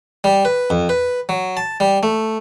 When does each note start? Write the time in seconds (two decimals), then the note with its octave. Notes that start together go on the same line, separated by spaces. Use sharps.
0.24 G3
0.45 B4
0.70 F2
0.89 B4
1.29 F#3
1.57 A5
1.80 G3
2.03 A3